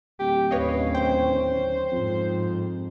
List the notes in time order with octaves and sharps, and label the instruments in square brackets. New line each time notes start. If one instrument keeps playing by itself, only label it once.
[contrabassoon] D1 [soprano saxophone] G4
[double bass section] D#2 C#4 [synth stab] B4 C#5 D#5 [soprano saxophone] F5
[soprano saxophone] C5 [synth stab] G5
[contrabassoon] F2 [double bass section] G#2